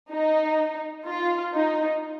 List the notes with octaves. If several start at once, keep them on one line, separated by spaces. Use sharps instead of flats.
D#4
F4
D#4